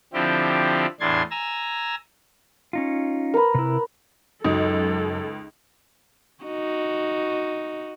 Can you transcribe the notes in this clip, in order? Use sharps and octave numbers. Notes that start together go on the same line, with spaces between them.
D3 F3 C4 E4 G4
E2 A2 D4 C6 G#6 A6
G#5 A#5 E6
C#4 D#4 F4
A#4 B4
C3 E4
C#2 F#2 D#4 A4
D#4 F#4